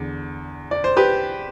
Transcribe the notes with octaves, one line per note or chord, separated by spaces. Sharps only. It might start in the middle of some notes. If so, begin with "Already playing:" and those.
Already playing: E2 D3
D5
C5
G4 B4